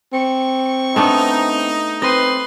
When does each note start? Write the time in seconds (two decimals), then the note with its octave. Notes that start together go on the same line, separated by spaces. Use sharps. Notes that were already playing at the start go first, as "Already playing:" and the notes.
0.13 C4 C#6
0.96 A3 B3 D4 D#4
2.02 C4 B4 D#5 C6